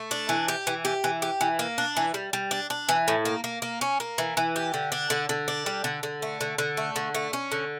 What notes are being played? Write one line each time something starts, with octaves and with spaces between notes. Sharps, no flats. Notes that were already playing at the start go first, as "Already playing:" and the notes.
Already playing: A3
D4
E3
G4
E3
G4
E3
G4
E3
A#3
D4
E3
G3
G3
D4
D4
E3
A2
A#3
A#3
A#3
C#4
A#3
E3
E3
G4
D3
D4
D3
D3
D4
G3
D3
D3
A3
D3
D3
A3
D3
A3
C#4
D3